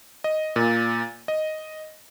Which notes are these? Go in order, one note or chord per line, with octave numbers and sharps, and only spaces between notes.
D#5
A#2
D#5